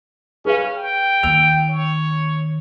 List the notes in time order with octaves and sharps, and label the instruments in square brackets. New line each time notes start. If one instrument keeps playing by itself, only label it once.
[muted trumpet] C#4 [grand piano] G#4 B4 F5
[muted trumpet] G5
[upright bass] D#2 [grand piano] E6 F7
[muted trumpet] C#5